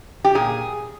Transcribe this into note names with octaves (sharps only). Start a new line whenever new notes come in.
G4
A#2 G#4